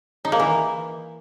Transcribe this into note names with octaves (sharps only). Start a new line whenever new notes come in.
D#4
A#3
E3